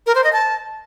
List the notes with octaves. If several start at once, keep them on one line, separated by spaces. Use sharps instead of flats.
A#4
C5
D#5
A5